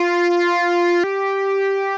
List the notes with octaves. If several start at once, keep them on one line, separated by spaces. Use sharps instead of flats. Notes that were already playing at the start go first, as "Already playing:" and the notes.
Already playing: F4
G4